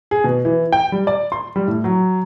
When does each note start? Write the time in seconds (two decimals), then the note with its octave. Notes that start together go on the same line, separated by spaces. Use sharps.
0.11 G#4
0.24 B2
0.45 E3
0.72 G5
0.92 G3
1.07 D5
1.32 C6
1.56 G3
1.68 A2
1.84 F#3